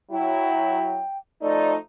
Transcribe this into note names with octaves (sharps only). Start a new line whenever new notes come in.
F#3 E4 G5
F3 A3 D#4 D5